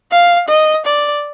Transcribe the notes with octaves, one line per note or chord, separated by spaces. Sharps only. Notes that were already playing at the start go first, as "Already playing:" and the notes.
F5
D#5
D5